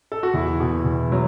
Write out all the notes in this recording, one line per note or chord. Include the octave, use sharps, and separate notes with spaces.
A4
F#4
E2 E4
B2
E2
F#3